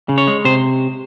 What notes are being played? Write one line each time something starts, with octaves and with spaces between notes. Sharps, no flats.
C#3
C#5
G#3
C3 C5